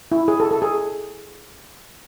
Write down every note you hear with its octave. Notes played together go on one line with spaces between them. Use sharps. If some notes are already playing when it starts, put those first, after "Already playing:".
E4
G#4
A4
A4
G#4